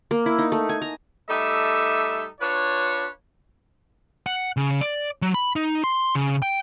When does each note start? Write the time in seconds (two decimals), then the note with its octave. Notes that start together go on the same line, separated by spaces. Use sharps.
0.11 A#3
0.26 E4
0.39 D#4
0.52 A3
0.69 G#5
0.82 A#5
1.30 G3 A3 D#4 A4 E5
2.40 D4 F4 B4 C#5
4.27 F#5
4.57 C#3
4.81 D5
5.22 F#3
5.34 B5
5.56 D#4
5.84 C6
6.15 C#3
6.42 G5